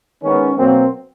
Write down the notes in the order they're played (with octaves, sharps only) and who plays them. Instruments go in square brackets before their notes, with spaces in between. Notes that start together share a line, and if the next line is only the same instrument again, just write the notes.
[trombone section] D#3 G#3 B3 C#4
B2 F#3 A#3 C4